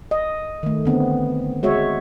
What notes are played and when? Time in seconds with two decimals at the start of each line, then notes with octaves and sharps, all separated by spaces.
0.11 D#5
0.63 D#3 A3
0.85 D3 B3 C4
1.63 G#3 F#4 C#5 E5